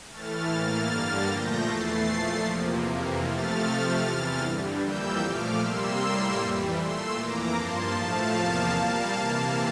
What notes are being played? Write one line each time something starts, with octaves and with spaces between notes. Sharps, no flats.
A2 E3 A3 F6 A6
A2 E3 A#3 F6 A6
G2 D3 G3 A#3 F6 A6
A#2 F3 A3 G6 A#6
E2 E3 A3 A6 C7
A#2 F3 A3
E2 C3 F3 A#3
F2 C3 E3 A#3
C3 F3 A3 F6 A6
C3 F3 A3
E2 C3 E3
G2 D3 G3
F2 E3 G3 A#3 E6 G6
A#2 F3 A3 D6 F6
C3 G3 A#3 C6 E6
A2 G3 A#3
F2 E3 G3
A#2 A3 C6 E6
F2 E3 A#3 A#5 D6
G2 F3 A#3 A5 C6
A2 F3 A3 F5 A5
E2 C3 F3 A#3 F5 A5
A#2 G3 A#3 F5 A5
C3 E3 A#3